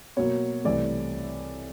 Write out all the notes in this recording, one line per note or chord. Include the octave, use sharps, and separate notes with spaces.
B2 F#3 A#3 C#5
C2 C3 E3 A3 D5